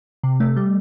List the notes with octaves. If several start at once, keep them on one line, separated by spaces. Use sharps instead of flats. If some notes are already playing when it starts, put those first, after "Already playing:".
C3
A3
G3